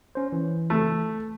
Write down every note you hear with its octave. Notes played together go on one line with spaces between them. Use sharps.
C#4 C5
E3
A3